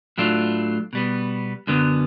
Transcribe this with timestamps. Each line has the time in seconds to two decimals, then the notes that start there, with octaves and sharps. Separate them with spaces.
0.18 A2 F#3 A3 D4 F4
0.93 B2 G3 B3
1.67 F#2 D3 F#3 B3